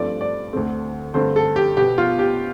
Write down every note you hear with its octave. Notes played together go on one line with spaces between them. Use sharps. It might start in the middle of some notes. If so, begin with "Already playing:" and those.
Already playing: G2 F3 A3 C4 D5
D5
D2 D3 A3 C4
G2 D3 A3 C4 C5
A4
G4
B2 B3 G4
F4
G4